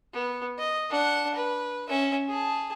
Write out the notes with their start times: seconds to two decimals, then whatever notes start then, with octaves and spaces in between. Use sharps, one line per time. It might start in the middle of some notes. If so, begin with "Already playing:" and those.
0.13 B3
0.58 D#5
0.90 D4 F#5
1.35 B4
1.89 C#4 E5
2.29 G#4 A5